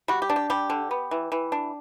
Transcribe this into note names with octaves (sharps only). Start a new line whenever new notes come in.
G3 F#4
G4
D4
G4
G3 G4
D3
B3
E3
E3
D4